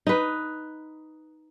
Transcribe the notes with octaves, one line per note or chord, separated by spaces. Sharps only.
D#4 B4